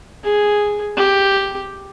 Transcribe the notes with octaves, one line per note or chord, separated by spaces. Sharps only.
G#4
G4